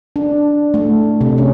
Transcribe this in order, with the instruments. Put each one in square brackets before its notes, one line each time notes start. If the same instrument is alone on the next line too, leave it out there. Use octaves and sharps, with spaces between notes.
[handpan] D4
A3
C3
C#4